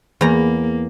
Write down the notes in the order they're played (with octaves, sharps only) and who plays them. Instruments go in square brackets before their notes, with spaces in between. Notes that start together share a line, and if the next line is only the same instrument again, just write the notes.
[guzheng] E2 A#5 [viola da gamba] A#3